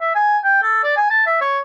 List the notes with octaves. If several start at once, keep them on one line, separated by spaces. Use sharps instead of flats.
E5
G#5
G5
A4
D5
G#5
A5
E5
C#5